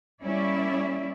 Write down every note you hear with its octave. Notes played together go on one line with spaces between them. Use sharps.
G3 A#3 C#4 E4 D5 E5